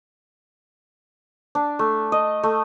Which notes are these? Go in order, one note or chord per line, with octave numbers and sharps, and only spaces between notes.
D4
A3
D#5
A3